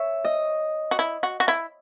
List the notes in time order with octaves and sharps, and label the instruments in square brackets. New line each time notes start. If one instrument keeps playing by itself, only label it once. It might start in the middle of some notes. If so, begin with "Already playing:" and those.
Already playing: [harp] C#5 E5
D#5
[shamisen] F#4
E4
F#4
F#4
E4